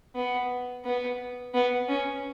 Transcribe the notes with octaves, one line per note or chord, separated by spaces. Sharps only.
B3
B3
B3
C#4